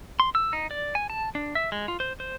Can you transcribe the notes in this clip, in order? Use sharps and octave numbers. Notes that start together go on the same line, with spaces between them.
C6
E6
D#4
D5
G#5
A5
D4
E5
G#3
F4
C5
C5